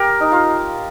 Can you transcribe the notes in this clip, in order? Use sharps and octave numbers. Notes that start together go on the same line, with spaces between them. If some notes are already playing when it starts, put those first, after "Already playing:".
Already playing: G4 A#4
D#4
F4